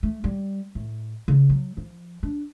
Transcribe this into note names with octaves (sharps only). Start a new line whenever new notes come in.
A3
G3
A2
C#3
F#3
F3
D4